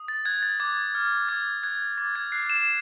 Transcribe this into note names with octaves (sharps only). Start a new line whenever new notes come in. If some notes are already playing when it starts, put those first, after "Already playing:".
Already playing: D#6
A6
F#6 G#6
A6
D6 G#6
F6
D6 G#6
F#6 G#6
D6 A6
G#6
F#6 C7
E7